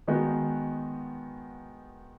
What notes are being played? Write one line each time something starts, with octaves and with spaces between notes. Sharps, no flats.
D#3 G#3 B3 D#4 F#4